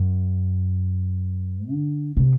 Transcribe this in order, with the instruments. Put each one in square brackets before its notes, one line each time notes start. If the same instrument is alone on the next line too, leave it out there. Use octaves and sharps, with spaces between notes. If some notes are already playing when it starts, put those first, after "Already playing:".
Already playing: [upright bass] F#2
D3
C3